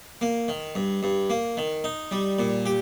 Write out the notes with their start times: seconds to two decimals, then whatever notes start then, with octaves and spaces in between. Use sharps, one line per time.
0.21 A#3
0.48 D#3
0.75 G2
1.03 G2
1.30 A#3
1.57 D#3
1.84 D#4
2.11 G3
2.39 A#2
2.66 G4